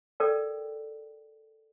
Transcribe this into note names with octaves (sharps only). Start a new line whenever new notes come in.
A4 A#4 D5 G5